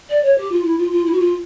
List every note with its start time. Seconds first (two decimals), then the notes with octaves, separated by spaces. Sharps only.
0.10 D5
0.24 C#5
0.38 G4
0.51 F4
0.64 E4
0.78 F4
0.92 F4
1.06 E4
1.13 F#4
1.20 F4